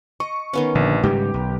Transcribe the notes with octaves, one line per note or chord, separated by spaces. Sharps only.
D#5 C#6
D#3 B3 C#4
A#1 D3
G#2 C#3 G3 G4
B1